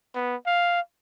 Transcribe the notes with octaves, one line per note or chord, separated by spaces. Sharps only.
B3
F5